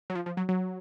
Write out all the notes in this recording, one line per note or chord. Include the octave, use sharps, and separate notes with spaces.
F#3
F3
F3
F#3
F#3